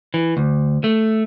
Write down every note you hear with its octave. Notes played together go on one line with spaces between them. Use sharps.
E3
D2
A3